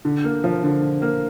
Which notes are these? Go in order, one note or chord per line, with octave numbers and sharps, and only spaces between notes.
D3
A#3
F3
D3
D3
A#3